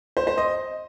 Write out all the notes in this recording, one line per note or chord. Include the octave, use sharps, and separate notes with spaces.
C5
C5
D#5